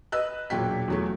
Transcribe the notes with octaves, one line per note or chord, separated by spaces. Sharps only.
B4 D#5 E6 F#6
E1 A#2 F#3 G5 B6
E2 F#3 A3